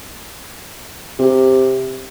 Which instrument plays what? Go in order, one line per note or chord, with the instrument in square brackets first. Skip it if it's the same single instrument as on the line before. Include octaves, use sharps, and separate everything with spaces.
[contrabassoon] C3